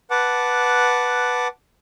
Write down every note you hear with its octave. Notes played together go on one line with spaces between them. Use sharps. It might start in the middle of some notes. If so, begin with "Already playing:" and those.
B4 F#5 A5 D6